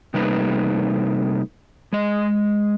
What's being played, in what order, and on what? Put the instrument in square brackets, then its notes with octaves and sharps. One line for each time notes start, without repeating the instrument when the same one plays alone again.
[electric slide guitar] C3 G3 A3 A#3 D#4 B4
G#3 D#5